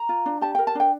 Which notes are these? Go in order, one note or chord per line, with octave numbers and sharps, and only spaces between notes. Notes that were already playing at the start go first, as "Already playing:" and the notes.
Already playing: A#5
F4
D4
G4 A5
A#4 G5
A5
D4 G5